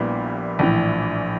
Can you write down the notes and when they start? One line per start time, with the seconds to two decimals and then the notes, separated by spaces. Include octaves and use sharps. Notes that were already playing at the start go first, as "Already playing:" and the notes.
Already playing: A#1 A#2 G3 B3 E4
0.59 A#1 A2 E3